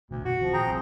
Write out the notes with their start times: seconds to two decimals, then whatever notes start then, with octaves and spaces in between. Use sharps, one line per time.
0.11 A1 D2 B2 D3
0.25 F#2 B2 D#3 F#4
0.40 D1 D#3 F3 C4
0.53 A#2 D#3 G#4 G5 A#5
0.67 G#1 D2 G3 C4